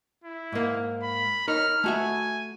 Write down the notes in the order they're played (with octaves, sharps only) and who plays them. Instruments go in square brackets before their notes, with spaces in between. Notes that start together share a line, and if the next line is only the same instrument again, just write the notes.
[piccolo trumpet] E4
[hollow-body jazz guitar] G#2 A#3
[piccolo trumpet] B5
[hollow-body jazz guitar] D#4 A#4 C#5 [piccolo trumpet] F6
[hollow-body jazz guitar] A3 F#4 E5 [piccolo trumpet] G#5